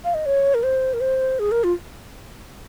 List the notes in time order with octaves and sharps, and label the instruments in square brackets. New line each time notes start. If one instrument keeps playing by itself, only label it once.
[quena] F5
D#5
C#5
A#4
C5
A#4
C5
G#4
A#4
F4